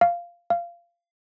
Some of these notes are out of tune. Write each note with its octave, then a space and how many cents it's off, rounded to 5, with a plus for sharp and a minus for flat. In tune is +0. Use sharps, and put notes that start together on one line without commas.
F5 -10
F5 -20